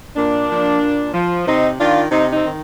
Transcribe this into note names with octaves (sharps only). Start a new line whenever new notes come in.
A#2 A#3 D4
F3
A#2
F3
C3 C4 D#4
D#3 D4 F4
C3 C4 D#4
C4 D#4
D#3